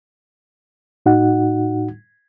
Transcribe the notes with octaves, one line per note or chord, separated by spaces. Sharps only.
A2 D#4 F#4 F#5